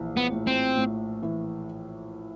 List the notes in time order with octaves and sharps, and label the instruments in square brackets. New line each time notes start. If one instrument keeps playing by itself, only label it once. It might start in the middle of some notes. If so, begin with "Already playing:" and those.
Already playing: [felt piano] A#1 E3
[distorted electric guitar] B3
[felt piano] A2
[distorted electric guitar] C4
[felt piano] A2
E3